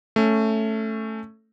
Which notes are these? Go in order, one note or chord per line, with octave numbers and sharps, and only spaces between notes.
A3 C#4